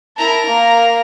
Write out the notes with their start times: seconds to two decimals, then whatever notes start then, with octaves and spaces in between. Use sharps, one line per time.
0.17 E4 A#4 A5 A#5
0.47 A#3